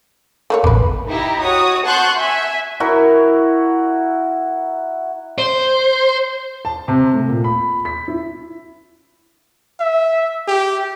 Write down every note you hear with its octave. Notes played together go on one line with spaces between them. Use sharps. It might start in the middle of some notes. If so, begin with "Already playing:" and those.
A3 A#3 C#5
E1 A1 A#3 B4
D#4 E4 G4 A#5
F#4 C#5 D#6
F#5 A5 C6 C#6 F#6 G6
E5 G#5
E4 F#4 A#4
C5
A5
C3
A3
A#2
B5
B6
E4
E5
G4